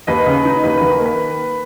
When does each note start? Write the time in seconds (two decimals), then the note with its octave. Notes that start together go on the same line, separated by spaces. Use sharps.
0.07 D#2 B4 D#5
0.26 C#3
0.45 D#4
0.64 D#2 B4
0.77 D#3 B4
1.00 A#3
1.06 B4